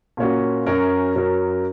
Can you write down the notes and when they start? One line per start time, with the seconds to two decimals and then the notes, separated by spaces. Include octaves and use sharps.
0.17 A#2 A#3 C#4 F#4
0.66 F#2 F#3 C#4 A#4
1.15 F#2 F#3 C#4 A#4